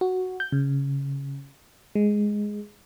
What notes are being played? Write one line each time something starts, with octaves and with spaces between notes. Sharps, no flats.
F#4
G6
C#3
G#3